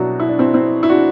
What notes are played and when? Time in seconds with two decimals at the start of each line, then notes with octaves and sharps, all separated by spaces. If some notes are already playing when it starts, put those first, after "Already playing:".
Already playing: C2 B2 F#3 D4 F#4
0.20 E4
0.29 D4
0.39 C4 E4
0.54 C4 E4
0.83 E4
0.89 D4 F#4